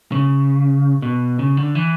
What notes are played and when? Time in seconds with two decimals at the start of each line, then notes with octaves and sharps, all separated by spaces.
0.12 C#3
1.02 B2
1.39 C#3
1.57 D3
1.75 E3